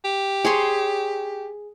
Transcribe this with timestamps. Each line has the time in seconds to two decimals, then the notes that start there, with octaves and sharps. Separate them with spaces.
0.05 G4
0.45 G#4 C#5 C6